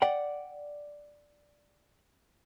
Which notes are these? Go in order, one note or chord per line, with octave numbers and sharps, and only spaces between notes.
D5 F#5 G5